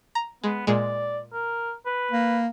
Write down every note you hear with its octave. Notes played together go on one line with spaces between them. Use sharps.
A#5
G#3 B3
A#2 G#3 D5
A#4
B4
A#3